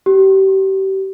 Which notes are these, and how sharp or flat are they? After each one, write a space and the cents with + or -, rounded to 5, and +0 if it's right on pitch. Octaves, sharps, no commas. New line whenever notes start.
G4 -30